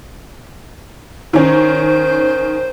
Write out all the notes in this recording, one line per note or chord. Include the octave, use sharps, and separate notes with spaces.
D#3 C#4 C5